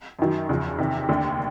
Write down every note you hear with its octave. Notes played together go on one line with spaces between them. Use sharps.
F#2 D#3 F#3
E2 C#3 F3
E2 C3 D#3
F1 D#2 D3